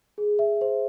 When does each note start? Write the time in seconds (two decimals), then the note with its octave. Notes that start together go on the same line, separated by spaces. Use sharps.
0.18 G#4
0.39 E5
0.61 C5